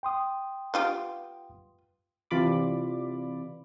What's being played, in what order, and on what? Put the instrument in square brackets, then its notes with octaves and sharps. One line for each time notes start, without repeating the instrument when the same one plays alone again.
[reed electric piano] G5 C6 D#6
[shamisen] B3 F4 G4
[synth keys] C3 E3 F4 D5 B5 D6